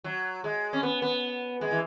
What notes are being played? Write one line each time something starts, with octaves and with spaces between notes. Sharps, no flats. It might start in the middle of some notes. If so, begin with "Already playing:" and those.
F#3
G#3
C#4
B3
B3
G#3
E3